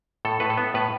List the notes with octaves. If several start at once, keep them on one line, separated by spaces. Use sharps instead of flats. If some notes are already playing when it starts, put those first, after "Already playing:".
A2 A4
A2 B4
A4
B3
A2 B4